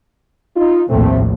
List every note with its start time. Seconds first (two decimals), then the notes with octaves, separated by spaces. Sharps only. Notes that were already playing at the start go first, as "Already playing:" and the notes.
0.56 D#4 F4
0.90 A#1 D#2 A2 A3 C4